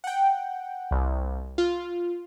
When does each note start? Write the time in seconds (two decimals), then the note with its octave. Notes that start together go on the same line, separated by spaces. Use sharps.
0.04 F#5 G5
0.91 C2
1.58 F4